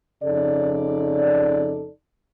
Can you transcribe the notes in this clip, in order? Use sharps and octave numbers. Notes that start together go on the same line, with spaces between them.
F2 C#3 D#4 A4 D5